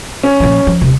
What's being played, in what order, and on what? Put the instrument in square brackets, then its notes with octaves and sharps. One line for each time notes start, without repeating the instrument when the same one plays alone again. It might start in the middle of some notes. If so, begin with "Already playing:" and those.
[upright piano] C#4
[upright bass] A#2 F3
F3
D#1 C3